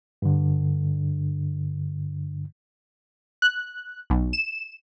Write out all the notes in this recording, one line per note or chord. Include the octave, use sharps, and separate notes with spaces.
G2 D3
F#6
B1
E7